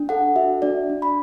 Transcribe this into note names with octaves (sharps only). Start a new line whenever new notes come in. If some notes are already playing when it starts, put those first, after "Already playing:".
Already playing: D4
A4 F#5
F#4 E5
D4 D5
D4
B5